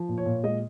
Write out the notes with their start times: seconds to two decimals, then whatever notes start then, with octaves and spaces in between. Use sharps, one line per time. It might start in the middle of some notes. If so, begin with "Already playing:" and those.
Already playing: F3
0.09 A#2
0.18 C#5
0.26 A#2
0.43 G#3 D#5